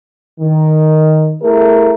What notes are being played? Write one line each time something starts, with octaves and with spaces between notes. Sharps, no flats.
D#3
A3 E4 G#4 A#4